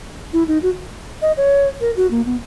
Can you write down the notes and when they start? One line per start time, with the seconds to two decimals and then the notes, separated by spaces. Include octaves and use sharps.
0.33 E4
0.48 D#4
0.63 F#4
1.22 D#5
1.37 C#5
1.81 A#4
1.96 F#4
2.11 A#3
2.26 B3